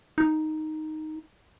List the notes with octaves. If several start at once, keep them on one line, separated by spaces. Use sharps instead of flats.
D#4